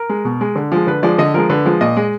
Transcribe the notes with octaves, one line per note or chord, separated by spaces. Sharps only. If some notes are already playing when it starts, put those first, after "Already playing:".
Already playing: A#4
G#3
B2
G#3
D3
F3 G#3
D3 B4
F3 G#3 D5
D3 D#5
F3 G#3 A#4
D3 B4
F3 G#3
A#2 D#5
G#3